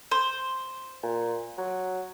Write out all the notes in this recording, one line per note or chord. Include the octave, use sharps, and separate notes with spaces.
C5
A#2
F#3